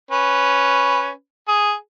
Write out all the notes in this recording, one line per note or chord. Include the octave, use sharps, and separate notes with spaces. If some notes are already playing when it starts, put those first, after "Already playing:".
C#4 B4
G#4